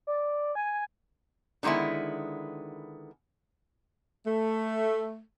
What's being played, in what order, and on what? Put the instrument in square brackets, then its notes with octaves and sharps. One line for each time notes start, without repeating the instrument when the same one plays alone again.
[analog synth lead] D5
G#5
[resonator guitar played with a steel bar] D3 D#3 G#3 B3 E4
[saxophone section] A3